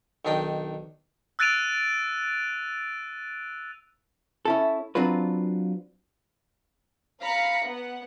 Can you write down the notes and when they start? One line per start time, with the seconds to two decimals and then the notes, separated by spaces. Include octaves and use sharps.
0.25 B1 D#3 D4 D#5 G5
1.39 E6 F#6 A6 D7 D#7 F7
4.45 C#4 E4 A4
4.95 F#3 C4 D4 F4 B4
7.21 F5 A#5 B5 B6 C#7
7.64 B3 F#5